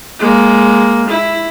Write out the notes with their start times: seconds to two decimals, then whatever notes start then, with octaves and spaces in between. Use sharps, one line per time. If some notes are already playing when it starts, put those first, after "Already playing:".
0.19 G#3 A#3
1.09 E4